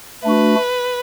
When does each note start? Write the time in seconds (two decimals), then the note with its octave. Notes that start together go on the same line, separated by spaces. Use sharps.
0.24 A3 D4 F#4 B4